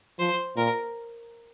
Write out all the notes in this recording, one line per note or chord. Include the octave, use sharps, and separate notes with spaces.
F3 C5
A#2 A#4